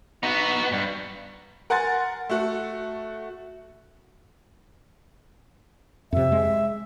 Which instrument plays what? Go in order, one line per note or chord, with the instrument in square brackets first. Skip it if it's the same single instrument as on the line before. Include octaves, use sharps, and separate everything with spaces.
[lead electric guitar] B3 [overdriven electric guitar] D#4 F#4
[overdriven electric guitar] G2
[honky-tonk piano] A#4 F#5 G#5 C6 A6
A3 F#4 A4
[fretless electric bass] F2 C3 [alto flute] E5
[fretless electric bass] G#3